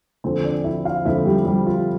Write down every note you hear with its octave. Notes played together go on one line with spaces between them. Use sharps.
D3 F3 C4 C5
D4 D5
E4 E5
F4 F5
D3 F3 C4 E4 E5
G3 G4
G3 G4
F4